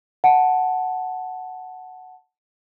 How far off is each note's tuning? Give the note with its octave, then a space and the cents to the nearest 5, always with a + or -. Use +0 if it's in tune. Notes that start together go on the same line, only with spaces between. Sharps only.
F#5 +0 A5 +0